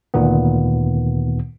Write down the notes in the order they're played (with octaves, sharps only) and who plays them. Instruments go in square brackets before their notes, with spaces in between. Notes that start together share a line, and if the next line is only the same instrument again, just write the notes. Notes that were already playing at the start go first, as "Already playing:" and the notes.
[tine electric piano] D2 A#2 D#3 B3